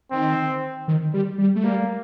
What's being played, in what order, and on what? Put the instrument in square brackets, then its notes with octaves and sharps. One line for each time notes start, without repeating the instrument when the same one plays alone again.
[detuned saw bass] D#3 [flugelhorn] C4
[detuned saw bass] D#3
G3
G3
A3
[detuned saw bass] G3 [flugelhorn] A#3